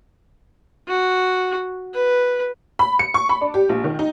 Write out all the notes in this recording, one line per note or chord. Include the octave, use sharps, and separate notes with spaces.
F#4
B4
B5
C#7
C#6
B5
D4
G4
A#1
D#3
D#4